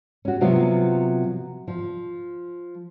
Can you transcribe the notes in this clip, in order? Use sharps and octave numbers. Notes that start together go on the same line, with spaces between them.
C#4 F#4
C3 F3 F#3 B3 F4
F3